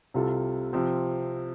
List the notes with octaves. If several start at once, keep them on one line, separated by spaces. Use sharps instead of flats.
C2 C3 G3 F4 A4
C3 F3 C4